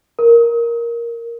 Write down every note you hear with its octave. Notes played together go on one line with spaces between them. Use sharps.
A#4